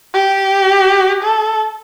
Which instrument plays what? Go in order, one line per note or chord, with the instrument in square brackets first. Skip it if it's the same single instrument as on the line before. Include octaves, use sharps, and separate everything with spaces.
[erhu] G4
A4